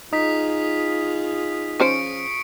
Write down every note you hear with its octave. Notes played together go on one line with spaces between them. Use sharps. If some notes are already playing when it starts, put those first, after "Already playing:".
D#4 F4 G#4 D#6 B6
F3 C#4 C5 C#6 C#7 D7